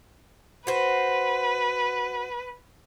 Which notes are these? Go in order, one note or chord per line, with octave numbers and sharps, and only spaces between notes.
F#4 B4 C5